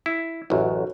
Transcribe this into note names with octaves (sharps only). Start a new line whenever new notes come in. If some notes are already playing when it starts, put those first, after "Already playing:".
E4
A1 F#2 F#4